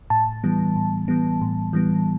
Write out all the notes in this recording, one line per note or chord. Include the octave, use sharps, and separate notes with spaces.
A2 A5
E3 G3 B3
A2
E3 G3 B3
A2
E3 G3 B3